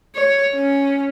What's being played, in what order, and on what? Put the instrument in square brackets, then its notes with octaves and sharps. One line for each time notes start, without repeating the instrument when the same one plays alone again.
[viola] C#5
C#4